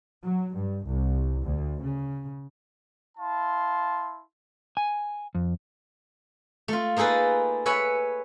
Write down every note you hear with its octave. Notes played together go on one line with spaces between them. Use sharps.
F#3
G2
C2
D2
C#3
E4 F5 A5 C6
G#5
F2
A3 F4
A#3 D#4 G#4 A4 B4
B4 C#5 E5 G#5 B5